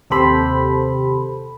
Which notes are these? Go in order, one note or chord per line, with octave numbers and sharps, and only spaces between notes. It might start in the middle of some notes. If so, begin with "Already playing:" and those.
D#2 C3 G4 A4 C5 B5